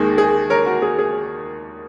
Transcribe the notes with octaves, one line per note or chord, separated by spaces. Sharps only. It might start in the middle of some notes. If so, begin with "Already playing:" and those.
Already playing: D#2 D#3 G#3 G#4
G#4
A#4 C#5
F#4 A#4
G#4
G#4